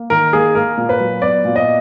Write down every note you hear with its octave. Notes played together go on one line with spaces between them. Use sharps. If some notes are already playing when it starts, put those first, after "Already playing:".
Already playing: A#3
D#3 A#4
A#3 G#4
A#3 A#4
A#2
B4
F#3
B3 D5
A#2
D#5